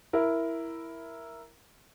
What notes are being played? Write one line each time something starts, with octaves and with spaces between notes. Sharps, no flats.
E4 A#4